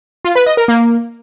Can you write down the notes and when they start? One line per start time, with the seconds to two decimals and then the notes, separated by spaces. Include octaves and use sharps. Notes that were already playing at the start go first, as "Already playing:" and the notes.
0.25 F4
0.35 B4
0.46 D#5
0.57 A#4
0.68 A#3